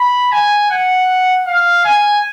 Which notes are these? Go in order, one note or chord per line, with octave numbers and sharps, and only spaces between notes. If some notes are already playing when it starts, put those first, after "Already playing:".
Already playing: B5
G#5
F#5
F5
G#5